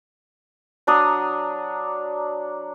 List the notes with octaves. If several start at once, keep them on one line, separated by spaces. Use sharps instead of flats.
F#3 D4 A#5 D#6